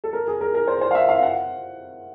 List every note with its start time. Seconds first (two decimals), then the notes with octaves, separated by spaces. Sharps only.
0.04 A4
0.13 A#4
0.27 G#4
0.41 A#4
0.55 A#4
0.67 C5
0.81 C5
0.91 F5
0.95 E5
1.09 F5
1.23 F#5